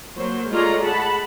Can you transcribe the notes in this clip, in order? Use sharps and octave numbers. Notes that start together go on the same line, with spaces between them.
F#3 A#3 C5
G#3 A3 F4 C#5 D5 A#5
G#4 F#5 A5 B5